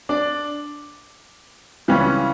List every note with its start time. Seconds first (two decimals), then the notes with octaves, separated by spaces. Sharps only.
0.09 D4 D5
1.88 C#2 C#3 E3 G3 C#4